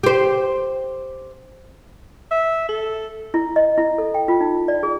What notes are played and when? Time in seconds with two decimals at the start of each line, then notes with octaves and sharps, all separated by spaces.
0.03 G4 C5
2.31 E5
2.69 A4
3.34 E4
3.56 D#5
3.77 E4
3.98 A4
4.14 G5
4.28 F4
4.41 D#4
4.68 D5
4.83 G#4